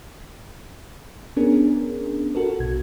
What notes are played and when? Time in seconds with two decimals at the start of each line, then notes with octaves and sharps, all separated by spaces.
1.37 B3 C#4 D4 G#4 A#4
2.35 F#4 A4 A#4
2.59 B1 B2 G#6